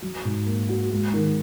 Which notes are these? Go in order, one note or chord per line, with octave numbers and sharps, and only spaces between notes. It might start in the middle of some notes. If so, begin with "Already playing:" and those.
F#3
G#2
A#3
F#4
G#3
D#3